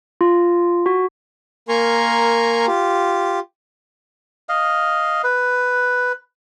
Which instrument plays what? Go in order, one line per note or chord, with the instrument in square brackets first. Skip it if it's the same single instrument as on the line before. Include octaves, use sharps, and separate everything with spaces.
[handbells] F4
F#4
[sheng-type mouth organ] A#3 A#4 G#5 A#5 C6 C#6
F4 G4
[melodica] D#5 F5
B4